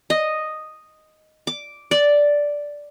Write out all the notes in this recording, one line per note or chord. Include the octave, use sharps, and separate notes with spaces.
D#5
D6
D5